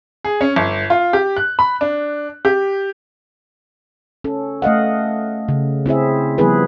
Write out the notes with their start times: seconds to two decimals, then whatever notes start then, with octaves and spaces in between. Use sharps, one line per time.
0.24 G#4
0.41 C#4
0.56 G1
0.90 F4
1.13 G4
1.37 F#6
1.59 B5
1.81 D4
2.45 G4
4.24 C#4 A4
4.62 A3 D#5 F5 F#5
5.49 C#3
5.86 C4 E4 G#4 E5
6.38 F3 G3 B3 E4 G#4 B4